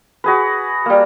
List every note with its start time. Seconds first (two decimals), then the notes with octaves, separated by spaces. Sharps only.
0.24 F#4 G#4 B4
0.86 G3 A#3